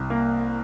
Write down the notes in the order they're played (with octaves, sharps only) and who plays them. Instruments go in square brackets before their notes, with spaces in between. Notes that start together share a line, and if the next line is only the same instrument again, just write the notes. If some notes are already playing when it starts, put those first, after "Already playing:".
Already playing: [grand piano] C2
A#3